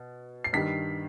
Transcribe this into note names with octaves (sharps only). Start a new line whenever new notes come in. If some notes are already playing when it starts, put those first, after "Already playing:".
Already playing: B2
C7
G2 D#3 G3 B6